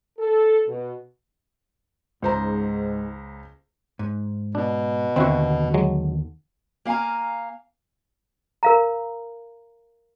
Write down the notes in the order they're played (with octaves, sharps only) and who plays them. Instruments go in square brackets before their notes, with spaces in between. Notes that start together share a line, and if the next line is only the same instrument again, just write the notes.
[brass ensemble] A4
B2
[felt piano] C#2 C5 A#5 [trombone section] G#2
[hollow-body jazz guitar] G#2
[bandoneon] B2 [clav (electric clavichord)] D4
[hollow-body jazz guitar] D#2 D3 [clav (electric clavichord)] C4 E4 F#4
[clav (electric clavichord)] F#3 G#3
[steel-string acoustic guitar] A#3 F5 G5 G#5 A#5
[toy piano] A#4 F5 A#5